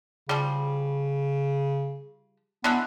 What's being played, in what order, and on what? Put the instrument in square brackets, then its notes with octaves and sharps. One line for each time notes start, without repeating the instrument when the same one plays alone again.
[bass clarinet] C#3 [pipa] F3 G3
[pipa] D3 E3 G#3 [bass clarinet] B3